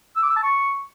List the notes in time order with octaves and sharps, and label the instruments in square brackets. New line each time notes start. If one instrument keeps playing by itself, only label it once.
[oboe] E6
D6
E6
A5
C#6